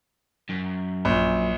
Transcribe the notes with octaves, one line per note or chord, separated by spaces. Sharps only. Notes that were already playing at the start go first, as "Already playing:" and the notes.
F#2
A#1